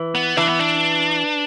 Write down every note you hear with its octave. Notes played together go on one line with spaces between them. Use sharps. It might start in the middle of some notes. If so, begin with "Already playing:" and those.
Already playing: E3
B3
E3 D4
B3
D4